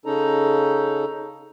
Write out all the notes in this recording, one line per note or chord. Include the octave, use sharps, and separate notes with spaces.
C#3 C#4 D#4 A4 A#5